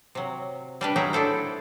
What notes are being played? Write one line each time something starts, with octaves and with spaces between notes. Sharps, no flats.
C3 F#3
G3 D4 B4
F#3 A#3 D#4 G#4 E5
D4 E4 A4 C5